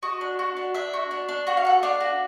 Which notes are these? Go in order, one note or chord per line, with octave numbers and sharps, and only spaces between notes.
F#4 D#5
D4
F#4
D4
D4 E5
F#4
D4
D4
F#4 F#5
F5
A4 F#5
D4 F5
F#4